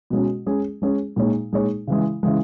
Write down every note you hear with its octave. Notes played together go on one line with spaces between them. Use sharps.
B2 G#3 C#4
G#3 C#4 G#4
G#3 C#4 G#4
A#2 G#3 D#4 G#4 C#5
A#2 G#3 D#4 G#4 C#5
C#3 E3 G#3
C#3 E3 G#3